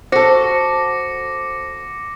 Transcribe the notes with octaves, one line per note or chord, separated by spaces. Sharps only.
F#4 A4 C5 D6 A#6 C#7